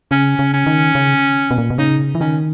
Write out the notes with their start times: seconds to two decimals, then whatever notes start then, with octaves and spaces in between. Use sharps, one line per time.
0.11 C#3 C#4
0.39 C#3
0.54 C#4
0.66 D#3
0.95 C#3
1.51 B2
1.58 A#2
1.70 B2
1.78 C#3 D#4
2.15 E3
2.20 D#3 C#4